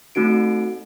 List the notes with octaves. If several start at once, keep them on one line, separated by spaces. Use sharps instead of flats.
A3 C4 D#4 F#4 D7